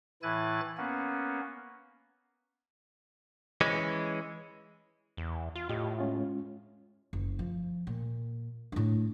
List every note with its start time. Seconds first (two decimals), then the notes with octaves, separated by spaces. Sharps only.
0.22 A2 E3 E4 G#5 F#6 A6
0.77 A#3 B3 C#4
3.61 E3 G#3 C#4
5.17 E2
5.55 F4
5.69 A2 F4 G4 D#5
5.98 G#3 C#4 F4
7.13 F#1
7.39 F3
7.87 A#2
8.72 A2 D4